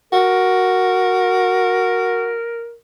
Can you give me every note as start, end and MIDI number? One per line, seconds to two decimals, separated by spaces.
0.13 2.39 66
0.13 2.74 70